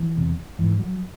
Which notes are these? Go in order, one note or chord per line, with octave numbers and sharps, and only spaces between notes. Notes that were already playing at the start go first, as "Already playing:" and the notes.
Already playing: E3
E2 C3
G#2 E3
F#3